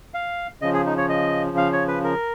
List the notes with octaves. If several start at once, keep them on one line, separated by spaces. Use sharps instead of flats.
F5
C#3 F3 D#5
G#4
D#4
C#5
D#5
F5
C#5
B4
A#4